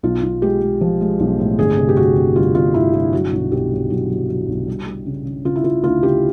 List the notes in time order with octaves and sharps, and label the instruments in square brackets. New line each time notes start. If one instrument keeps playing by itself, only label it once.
[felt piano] B1 F4
B1
G#3 G4
G#3
F3
G#3
B1
A2
G1 G#4
C3
G4
G1 F#4
C3
G1 F4
G1 F4
G1 E4
G1 F4
F#3 F#4
B1
B1 G4
F#3
B1 F#4
F#3
F#3
B1
G3
G3
C#3
C#3
C#3 F4
E4
C#3 F4
D2 F4
C#3 G4